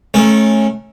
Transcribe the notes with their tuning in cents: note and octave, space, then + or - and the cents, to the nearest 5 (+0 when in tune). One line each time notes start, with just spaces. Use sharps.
A3 -25 C#4 -20 A#4 +0